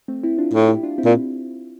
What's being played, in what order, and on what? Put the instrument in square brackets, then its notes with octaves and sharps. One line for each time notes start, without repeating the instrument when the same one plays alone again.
[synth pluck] A3 C4
C4 E4
D4 F4
[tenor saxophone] A2
[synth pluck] E4 G4
D4 F4
C4 E4
[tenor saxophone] A#2